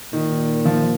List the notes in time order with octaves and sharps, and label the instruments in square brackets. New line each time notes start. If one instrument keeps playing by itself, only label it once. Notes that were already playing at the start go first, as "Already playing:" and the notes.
[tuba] A#2 [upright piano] D#3
[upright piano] F3